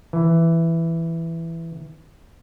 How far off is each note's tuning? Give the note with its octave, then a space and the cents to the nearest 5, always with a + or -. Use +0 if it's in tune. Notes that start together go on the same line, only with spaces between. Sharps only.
E3 +5